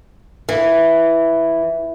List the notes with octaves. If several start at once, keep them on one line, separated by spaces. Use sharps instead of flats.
E3